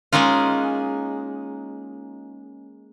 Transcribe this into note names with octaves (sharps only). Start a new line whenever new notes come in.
G#3 A#3 C#4 D#4 F4